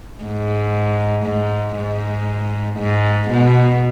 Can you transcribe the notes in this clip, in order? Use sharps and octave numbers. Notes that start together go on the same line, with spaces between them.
G#2
G#2
G#2
G#2
B2